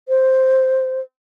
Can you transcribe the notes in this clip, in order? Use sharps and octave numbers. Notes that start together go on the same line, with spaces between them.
C5